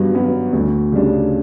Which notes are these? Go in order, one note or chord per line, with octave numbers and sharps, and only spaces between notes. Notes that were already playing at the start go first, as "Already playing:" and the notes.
Already playing: G2 F#3 B3
F#3 B3
D2
C#3 G3 D4